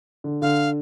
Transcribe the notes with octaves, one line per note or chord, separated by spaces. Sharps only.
D3
D3 F5